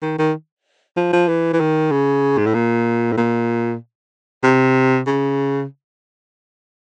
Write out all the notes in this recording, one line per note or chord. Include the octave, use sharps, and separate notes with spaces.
D#3
D#3
F3
F3
E3
E3
D#3
C#3
G#2
A2
A#2
A2
A#2
C3
C#3